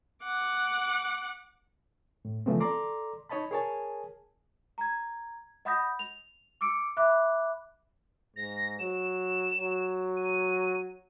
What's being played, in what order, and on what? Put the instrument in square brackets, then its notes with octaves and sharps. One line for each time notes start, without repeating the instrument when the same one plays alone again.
[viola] F#5 D6
[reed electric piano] A2
C#3 E3 F3 A3 B3 C4
A4 D5 A#5 C6 D6
D#4 C#5 D#5 A5 B5
G#4 A#4 C#5 G#5 A5
[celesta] A#5 G#6
D#5 F#5 B5 D#6 G6 A#6
F7
D6 E6 C#7 D7
E5 B5 D6 F#6
[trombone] G#2 [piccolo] A#6
[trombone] F#3 [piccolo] E7
[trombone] F#3
[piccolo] D#7